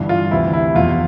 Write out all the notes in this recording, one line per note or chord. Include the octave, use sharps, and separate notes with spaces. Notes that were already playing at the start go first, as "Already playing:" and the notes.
Already playing: G1 G2 E3
F4
D2 C3 E3 E4
E4
F1 E2 B2 F4